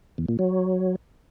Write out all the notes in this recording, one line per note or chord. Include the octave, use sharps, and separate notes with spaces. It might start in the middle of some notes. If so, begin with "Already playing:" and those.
E2
A#2
F#3